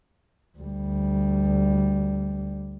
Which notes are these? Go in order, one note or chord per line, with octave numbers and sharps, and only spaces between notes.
D2 G3